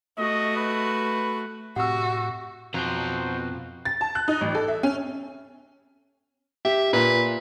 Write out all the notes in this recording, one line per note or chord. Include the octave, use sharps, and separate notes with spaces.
A3 F#4 D#5
B4
A2 C3 F#4 F#5 E6
F2 B2 F3 F#4 C5 A#5
A6
A5
F#6
D#4
A1
A4
E5
C#4
G4 E5
A#2 B4